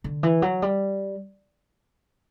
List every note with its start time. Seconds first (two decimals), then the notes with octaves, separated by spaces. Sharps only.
0.04 D3
0.23 E3
0.42 F#3
0.62 G3